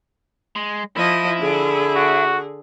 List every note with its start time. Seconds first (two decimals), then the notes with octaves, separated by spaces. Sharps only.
0.56 G#3
0.97 F3 E4 D#5
1.40 D3 G#4
1.96 F#4